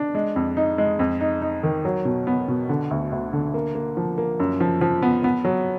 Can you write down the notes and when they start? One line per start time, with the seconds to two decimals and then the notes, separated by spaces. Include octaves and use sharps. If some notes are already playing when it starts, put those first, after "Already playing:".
Already playing: D4
0.15 G#3
0.36 F2
0.57 D#4
0.78 G#3
0.99 F2
1.21 D#4
1.42 D#4
1.63 D#3
1.85 F#3
2.05 B2
2.27 B3
2.48 B2
2.69 D3
2.91 D2
3.12 D2
3.33 D3
3.54 A#3
3.75 A#3
3.97 F3
4.18 A#3
4.40 F#2
4.60 F3
4.81 F3
5.02 B3
5.24 B3
5.45 F#3